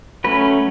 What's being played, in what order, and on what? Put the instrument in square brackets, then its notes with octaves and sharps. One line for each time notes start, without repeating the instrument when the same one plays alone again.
[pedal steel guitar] F#3 A3 C#4 B4